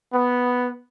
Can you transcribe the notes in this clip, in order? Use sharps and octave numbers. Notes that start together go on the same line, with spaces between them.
B3